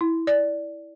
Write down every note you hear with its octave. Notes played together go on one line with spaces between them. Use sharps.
E4
D5